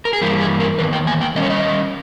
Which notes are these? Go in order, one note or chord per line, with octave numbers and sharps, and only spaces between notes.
A#4
G#4
G2 E3 G3 A#3 G4
G#4
A#4
E2 D#3 A#3 B4
G5
G#5
G5
D#3 G3 C#4 D#5
C#5
D#5